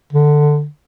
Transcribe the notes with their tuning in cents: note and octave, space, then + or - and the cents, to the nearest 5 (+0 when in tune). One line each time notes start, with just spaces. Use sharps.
D3 +10